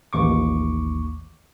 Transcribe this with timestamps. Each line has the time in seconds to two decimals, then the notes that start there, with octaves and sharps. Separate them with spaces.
0.13 A1 D#2 C#6 D6